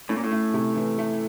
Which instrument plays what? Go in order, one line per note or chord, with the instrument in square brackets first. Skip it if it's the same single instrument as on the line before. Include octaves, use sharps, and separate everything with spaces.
[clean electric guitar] A2 [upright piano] C#4
[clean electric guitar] A#2
A2
[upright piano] A3
C3
E3
A3